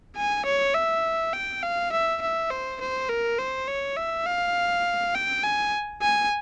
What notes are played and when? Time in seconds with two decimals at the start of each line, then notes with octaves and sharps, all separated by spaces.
0.17 G#5
0.46 C#5
0.74 E5
1.33 G5
1.63 F5
1.92 E5
2.22 E5
2.50 C5
2.81 C5
3.09 A#4
3.38 C5
3.68 C#5
3.97 E5
4.26 F5
5.14 G5
5.43 G#5
6.02 G#5